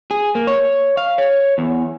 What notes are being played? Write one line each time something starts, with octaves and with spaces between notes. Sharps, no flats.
G#4
A#3
C#5
F5
C#5
E2